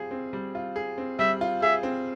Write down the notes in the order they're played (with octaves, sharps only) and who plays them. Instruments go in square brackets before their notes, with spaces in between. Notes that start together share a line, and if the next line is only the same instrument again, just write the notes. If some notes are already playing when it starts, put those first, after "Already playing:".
Already playing: [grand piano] G3 C4 F4 G#4
C4
G3
F4
G#4
C4
[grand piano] G3 [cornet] E5
[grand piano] F4
[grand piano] G#4 [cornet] E5
[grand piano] C4